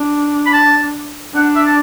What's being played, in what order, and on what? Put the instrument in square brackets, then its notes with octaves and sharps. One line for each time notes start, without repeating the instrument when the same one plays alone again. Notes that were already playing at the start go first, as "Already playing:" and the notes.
Already playing: [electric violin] D4
[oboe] B5
A5
[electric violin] D4 [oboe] F#5
[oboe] E5
A5